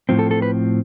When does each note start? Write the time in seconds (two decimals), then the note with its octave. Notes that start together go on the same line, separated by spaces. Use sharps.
0.09 A2 F3 C4
0.19 A4
0.31 A4
0.42 B4